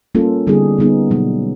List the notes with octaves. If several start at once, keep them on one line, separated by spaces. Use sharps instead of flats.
G3 A#3 C#4 F4 A4
D3 G3 B3 D#4 G#4
D3 G3 B3 D#4 G#4
B2 F#3 A#3 D#4